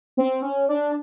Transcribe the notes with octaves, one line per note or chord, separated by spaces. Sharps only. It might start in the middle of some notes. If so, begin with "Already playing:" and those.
C4
C#4
D4